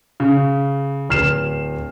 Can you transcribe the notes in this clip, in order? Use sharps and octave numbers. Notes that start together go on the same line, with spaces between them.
C#3
D1 F6 C7 E7